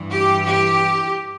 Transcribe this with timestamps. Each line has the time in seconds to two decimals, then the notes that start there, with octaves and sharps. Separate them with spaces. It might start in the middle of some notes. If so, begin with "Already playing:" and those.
Already playing: G2 E3
0.10 G4
0.45 G4